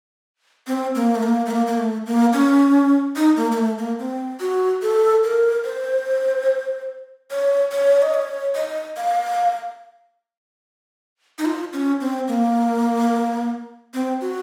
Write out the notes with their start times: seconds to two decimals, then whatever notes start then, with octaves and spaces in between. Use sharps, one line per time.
0.67 C4
0.95 A#3
1.15 A3
1.23 A#3
1.46 A3
1.51 A#3
1.67 A#3
1.78 A3
2.06 A#3
2.33 C#4
3.16 D#4
3.37 A#3
3.52 A#3
3.58 A3
3.78 A#3
3.99 C4
4.40 F#4
4.82 A4
5.24 A#4
5.65 C5
7.31 C#5
7.72 C#5
8.02 D#5
8.14 C#5
8.55 D#5
8.97 F5
11.39 D#4
11.45 F4
11.73 C#4
12.01 C4
12.28 A#3
13.94 C4
14.21 F#4